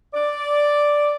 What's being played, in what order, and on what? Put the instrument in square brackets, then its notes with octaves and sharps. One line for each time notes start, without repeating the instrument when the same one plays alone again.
[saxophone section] D5